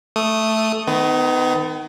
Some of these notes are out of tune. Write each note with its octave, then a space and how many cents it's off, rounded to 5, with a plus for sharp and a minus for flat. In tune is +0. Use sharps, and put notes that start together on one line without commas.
A3 +0 D#6 +0
D#3 +0 B3 +35